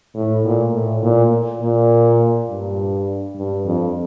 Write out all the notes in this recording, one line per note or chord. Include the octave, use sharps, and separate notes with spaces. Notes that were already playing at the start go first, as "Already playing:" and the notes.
A2
A#2
A2
A#2
A#2
G2
G2
F2